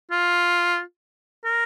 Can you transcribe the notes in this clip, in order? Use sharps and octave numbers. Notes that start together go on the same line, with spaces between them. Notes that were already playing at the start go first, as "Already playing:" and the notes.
F4
A#4